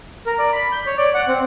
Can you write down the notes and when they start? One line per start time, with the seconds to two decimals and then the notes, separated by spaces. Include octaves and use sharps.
0.26 A#4
0.39 D5
0.53 B5
0.72 G6
0.86 C#5
0.98 D5
1.14 F#5
1.28 C4